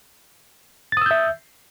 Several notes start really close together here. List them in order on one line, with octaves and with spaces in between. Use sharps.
A6 D#6 E6 G6 E5